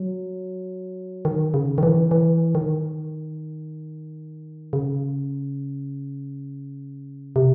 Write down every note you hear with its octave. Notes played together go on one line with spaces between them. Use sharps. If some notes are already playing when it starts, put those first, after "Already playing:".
Already playing: F#3
D#3
C#3
D#3
E3
E3
D#3
C#3
C3